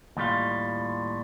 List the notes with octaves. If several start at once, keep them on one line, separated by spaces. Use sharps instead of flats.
D#2 A2 G3 F4